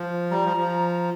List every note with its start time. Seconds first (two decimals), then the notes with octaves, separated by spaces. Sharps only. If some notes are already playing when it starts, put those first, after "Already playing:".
Already playing: F3
0.31 G3 A#5
0.44 F3
0.57 F3